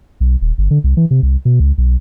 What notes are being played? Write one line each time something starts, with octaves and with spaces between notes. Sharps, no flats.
B1
D#1
G1
D3
C2
E3
C3
C2
B2
C#2
B1